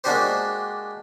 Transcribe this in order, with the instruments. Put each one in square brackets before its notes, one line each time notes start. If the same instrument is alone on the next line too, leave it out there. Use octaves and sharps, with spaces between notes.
[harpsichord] G#3 A#3 D4 F#4 G4 C5